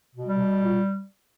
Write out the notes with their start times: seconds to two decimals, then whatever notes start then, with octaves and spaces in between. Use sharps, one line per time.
0.13 B2
0.25 G3
0.37 B2
0.60 A#2